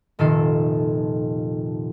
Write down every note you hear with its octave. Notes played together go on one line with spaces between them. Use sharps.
F1 A#2 D#3 A4 C7